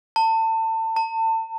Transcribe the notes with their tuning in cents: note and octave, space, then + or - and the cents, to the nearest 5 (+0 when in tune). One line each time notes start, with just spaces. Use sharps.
A5 +30
A5 +35